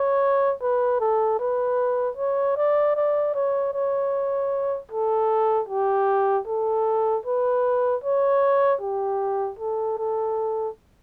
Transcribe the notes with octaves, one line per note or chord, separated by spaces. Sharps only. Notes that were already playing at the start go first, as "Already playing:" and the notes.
Already playing: C#5
B4
A4
B4
C#5
D5
D5
C#5
C#5
A4
G4
A4
B4
C#5
G4
A4
A4